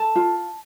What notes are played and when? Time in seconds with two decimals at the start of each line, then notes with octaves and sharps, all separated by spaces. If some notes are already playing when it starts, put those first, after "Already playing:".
Already playing: A4 A5
0.16 F4